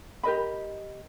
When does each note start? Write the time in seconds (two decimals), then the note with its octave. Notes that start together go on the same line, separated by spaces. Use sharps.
0.23 G4 A#4 D#5 B5